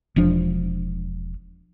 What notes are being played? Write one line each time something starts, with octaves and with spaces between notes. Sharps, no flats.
E1 E2 F3 D4